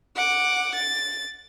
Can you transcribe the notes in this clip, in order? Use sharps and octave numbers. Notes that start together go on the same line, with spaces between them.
F#5 D6
A6